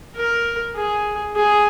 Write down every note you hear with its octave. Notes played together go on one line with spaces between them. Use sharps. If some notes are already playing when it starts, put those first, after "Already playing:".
A#4
G#4
G#4